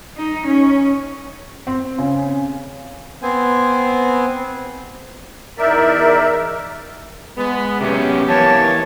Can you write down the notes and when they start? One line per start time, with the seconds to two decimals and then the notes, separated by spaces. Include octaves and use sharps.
0.17 D#4
0.46 C#4
1.67 C4
1.98 C#3
3.22 B3 C4 C5 G#5
5.58 E2 D#4 A#4 D5 E5
7.38 G#3 B3
7.81 C3 F#3 B3 C#4 G4
8.29 E3 A#3 C#5 A5